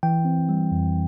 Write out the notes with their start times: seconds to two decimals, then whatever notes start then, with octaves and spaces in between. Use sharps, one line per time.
0.03 E3 G5
0.25 C4
0.49 G3
0.72 F2